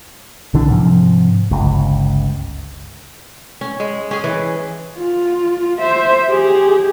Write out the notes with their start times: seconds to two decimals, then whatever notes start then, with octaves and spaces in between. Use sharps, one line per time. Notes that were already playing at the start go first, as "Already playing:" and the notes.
0.54 B1 D3 E3 D4
0.70 G#2 C3 F3
1.51 G1 C#2
3.61 C#4
3.80 G#3
4.11 C#4 G#4
4.24 E3
4.96 F4
5.79 C5 E5
6.28 G4 G#4